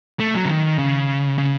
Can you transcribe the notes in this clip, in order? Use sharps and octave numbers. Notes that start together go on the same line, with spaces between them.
A3
F#3
C#3
D#3
C#3
C#3